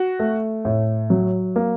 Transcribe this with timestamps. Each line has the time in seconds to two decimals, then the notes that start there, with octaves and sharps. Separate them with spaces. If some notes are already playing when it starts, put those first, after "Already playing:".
Already playing: F#4
0.19 A3
0.65 A2
1.10 F#3
1.56 A#3